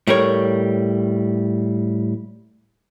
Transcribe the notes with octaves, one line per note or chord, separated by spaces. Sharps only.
A2 G3 A#4 C#5